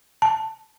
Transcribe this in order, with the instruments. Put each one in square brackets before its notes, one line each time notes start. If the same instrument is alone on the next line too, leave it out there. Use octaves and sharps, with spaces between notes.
[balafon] A5